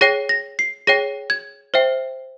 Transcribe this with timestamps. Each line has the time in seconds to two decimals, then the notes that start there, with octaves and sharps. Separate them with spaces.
0.01 G#4 C#5 G5 A#6
0.29 A#6
0.59 C7
0.87 G#4 C#5 G5 A#6
1.30 G#6
1.74 C5 E5 G5